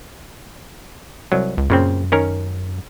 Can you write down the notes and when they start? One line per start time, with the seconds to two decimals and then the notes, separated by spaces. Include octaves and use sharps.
1.32 C2 F#3
1.57 C#2
1.70 F#2 A#2 C#3 C4
2.12 D#3 C#4 A#4